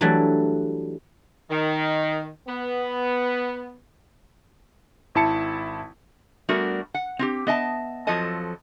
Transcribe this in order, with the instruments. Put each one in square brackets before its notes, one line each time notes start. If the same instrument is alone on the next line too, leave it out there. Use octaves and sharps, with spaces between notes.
[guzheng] E3 F#3 G3 A3 D4
[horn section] D#3
B3
[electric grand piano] G#1 E4 A5 C#7
[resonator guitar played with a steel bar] G3 A3 B3 D4 F#4 A#4
F#5
C4 F4 G4
B3 D#5 E5 A5
F2 F3 F#3 A4 D#5 A5